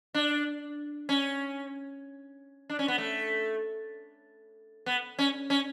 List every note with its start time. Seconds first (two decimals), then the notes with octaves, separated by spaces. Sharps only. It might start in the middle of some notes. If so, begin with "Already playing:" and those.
0.15 D4
1.09 C#4
2.70 D4
2.79 C#4
2.88 B3
2.98 A3
4.86 B3
5.19 C#4
5.50 C#4